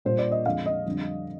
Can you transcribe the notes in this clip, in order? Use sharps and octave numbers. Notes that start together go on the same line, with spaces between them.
A#2 G3 C5
D5
D#5
F2 D3 G#3 F5
D#5
F2 D3 G3